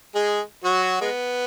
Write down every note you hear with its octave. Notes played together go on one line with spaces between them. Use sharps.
G#3 G#4
F#3 F#4
G#3 B3